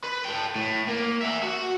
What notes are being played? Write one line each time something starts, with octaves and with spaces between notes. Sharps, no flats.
B4
A4 G5
A2
A#3
E5 F#5
F#4